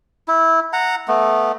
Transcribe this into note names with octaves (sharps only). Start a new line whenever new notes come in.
E4
F#5 A#5
A3 B3